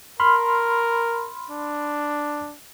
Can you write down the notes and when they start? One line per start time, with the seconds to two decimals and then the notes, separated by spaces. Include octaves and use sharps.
0.20 A#4 B5 C6 F6
1.50 D4